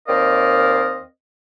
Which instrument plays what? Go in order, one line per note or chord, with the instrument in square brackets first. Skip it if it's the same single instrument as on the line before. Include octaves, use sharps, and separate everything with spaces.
[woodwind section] D#2 C4 A#4 D5 D#5 F5